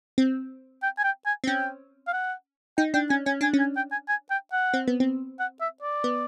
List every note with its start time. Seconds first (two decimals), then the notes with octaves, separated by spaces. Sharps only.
0.18 C4
0.82 G5
0.98 G#5
1.04 G5
1.26 G#5
1.44 C4
1.47 C#4 G5
2.08 F5
2.13 F#5
2.78 D#4 G5
2.94 D4 G5
3.10 C#4 G#5
3.26 C#4 G#5
3.41 D4 G#5
3.53 C#4
3.59 G#5
3.76 G5
3.92 G#5
4.08 G#5
4.30 G5
4.52 F#5
4.74 C4
4.87 B3
5.00 C4
5.39 F#5
5.61 E5
5.82 D5
6.04 B3